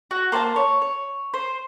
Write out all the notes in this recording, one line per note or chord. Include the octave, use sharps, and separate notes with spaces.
F#4
A#3 C5 G5 A5
C#5
C#5
C5